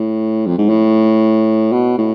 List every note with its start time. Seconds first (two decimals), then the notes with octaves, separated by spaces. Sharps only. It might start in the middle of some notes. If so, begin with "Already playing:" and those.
Already playing: A2
0.46 F2
0.58 G#2
0.69 A2
1.72 B2
1.98 A2